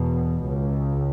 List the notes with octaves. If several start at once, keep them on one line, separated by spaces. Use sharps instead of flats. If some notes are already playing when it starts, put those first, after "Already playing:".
Already playing: E2 B2
C#2